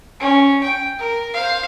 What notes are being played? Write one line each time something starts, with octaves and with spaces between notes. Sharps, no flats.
C#4
G5
A#4
C5 F5